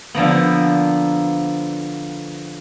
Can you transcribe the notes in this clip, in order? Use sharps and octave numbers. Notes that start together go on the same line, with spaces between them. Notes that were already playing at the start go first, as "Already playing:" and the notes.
D3 F3 A#3 B3